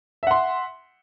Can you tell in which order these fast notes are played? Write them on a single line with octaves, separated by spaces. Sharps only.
E5 F#5 C6